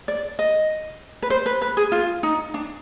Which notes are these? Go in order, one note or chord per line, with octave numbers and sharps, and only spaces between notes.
D5
D#5
B4
C5
B4
B4
G#4
F4
D#4
D4